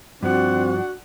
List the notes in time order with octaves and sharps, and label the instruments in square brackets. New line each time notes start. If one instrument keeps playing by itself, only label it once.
[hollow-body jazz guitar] G2 F3 [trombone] C4 [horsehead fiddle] D4 F#5 [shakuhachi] F#4